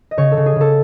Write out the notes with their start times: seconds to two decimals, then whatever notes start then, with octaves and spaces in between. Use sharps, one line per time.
0.11 D#5
0.17 C#3 C#5
0.32 A4
0.37 C#3
0.46 G#4
0.56 C#3 A4